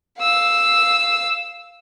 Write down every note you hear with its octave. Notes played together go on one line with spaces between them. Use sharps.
F5 E6